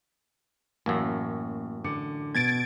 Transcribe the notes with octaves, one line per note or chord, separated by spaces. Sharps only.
A1 F#2 A#3 F#4
D3 D6 C#7
B2 G#6 A6 D7